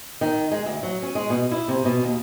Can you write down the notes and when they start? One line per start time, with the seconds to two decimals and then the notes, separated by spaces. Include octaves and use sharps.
0.21 D#3
0.52 G#3
0.66 D2
0.83 F#3
1.02 C#4
1.15 G#3
1.30 B2
1.52 E4
1.68 C3
1.85 B2
2.04 D#2